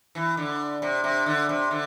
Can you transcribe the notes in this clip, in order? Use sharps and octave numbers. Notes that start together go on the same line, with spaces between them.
E3
D3
C3
C3
D3
C3
D3